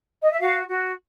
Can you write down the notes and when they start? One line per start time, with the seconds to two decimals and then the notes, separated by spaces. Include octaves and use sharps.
0.22 D#5
0.31 E5
0.40 F#4 F5
0.67 F#4